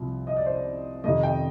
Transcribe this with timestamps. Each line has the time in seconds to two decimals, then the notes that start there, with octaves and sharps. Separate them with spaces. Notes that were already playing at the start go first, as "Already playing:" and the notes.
Already playing: C2 C3 F3
0.27 D#5
0.37 D5
0.46 C5
0.56 D5
1.04 F2 C3 D#3 D#5
1.23 G5